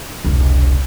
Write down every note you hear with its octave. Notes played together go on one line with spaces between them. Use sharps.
E1 C2